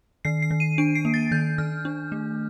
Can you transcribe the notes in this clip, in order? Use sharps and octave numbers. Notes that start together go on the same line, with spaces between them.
D#3 C7
C7
D#3
D#7
D4 D7
C7
A#3
A6
D#3 G6
D#3 F6
D4
A3